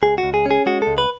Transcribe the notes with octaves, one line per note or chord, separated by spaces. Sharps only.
C#2 G#4
F#4
C#2
G#4
C#4 G#4
G#3 F#4
A4
C#2
B4